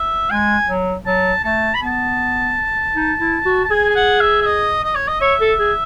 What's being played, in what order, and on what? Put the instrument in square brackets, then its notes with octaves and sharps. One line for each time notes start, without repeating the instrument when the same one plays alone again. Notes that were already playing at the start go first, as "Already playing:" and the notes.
Already playing: [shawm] E5
[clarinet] G#3 [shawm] G#5
[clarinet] F#3
[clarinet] F#3 [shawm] A5
[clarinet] A3 [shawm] A5
[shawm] B5
[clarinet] B3 [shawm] A5
[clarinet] D#4
E4
F#4
[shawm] A5
[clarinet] G#4 [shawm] G#5
[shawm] G#5
F#5
E5
E5
D#5
D#5
C#5
D#5
[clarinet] C#5 [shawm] E5
[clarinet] A4
G#4